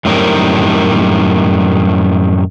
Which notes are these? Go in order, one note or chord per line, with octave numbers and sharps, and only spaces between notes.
F#2 A2 D#3 G3 C4 A#4